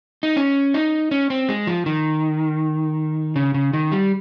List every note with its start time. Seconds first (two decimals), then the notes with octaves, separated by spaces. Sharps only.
0.23 D#4
0.37 C#4
0.74 D#4
1.11 C#4
1.30 C4
1.49 G#3
1.67 F3
1.86 D#3
3.36 C#3
3.54 C#3
3.73 D#3
3.92 G3